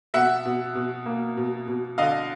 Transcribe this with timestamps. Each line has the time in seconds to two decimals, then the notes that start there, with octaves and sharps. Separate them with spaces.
0.14 B2 E5 F#5
0.45 B2
0.75 B2
1.06 A#3
1.37 B2
1.68 B2
1.98 D3 D#5 F5